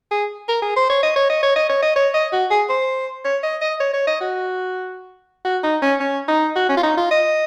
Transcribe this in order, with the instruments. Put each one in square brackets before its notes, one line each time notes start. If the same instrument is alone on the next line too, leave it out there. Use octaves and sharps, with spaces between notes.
[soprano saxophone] G#4
A#4
G#4
C5
C#5
D#5
C#5
D#5
C#5
D#5
C#5
D#5
C#5
D#5
F#4
G#4
C5
C#5
D#5
D#5
C#5
C#5
D#5
F#4
F#4
D#4
C#4
C#4
D#4
F#4
C#4
F4
D#4
F4
D#5